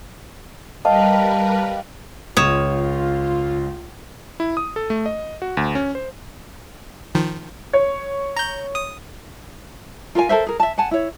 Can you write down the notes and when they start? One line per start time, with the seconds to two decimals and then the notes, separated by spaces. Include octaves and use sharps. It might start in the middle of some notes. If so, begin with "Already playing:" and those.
0.85 G3 A#4 B4 D#5 F5 G5 A5
2.37 C#2 F4 C#5 D#6 E7
4.40 E4
4.57 D#6
4.76 A4
4.90 A3
5.06 D#5
5.42 F#4
5.57 D2
5.75 C#4
5.95 C5
7.15 D#3 F3
7.73 C#5
8.36 A#5 G6
8.75 D#6
10.15 F4 A#4 F5 G#5
10.29 A4 A#4 C5 E5
10.47 G#4 A#4
10.60 E5 A5
10.78 F#5 G#5 A5
10.91 E4 C#5